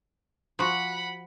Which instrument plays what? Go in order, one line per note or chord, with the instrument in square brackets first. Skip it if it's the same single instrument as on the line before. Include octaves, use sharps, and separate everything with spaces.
[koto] F3 F#4 [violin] F#5 B5